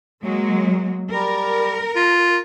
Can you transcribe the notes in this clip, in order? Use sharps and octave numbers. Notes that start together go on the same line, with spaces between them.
F#3 G#3 A#3
G3 A#4
F4